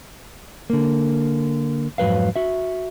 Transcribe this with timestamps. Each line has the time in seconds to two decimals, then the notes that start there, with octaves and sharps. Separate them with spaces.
0.70 D3 A#3
1.98 F2 G#2 F#3 B4 F5
2.36 F#4 E5